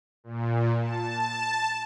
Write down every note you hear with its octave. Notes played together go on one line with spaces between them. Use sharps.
A#2
A5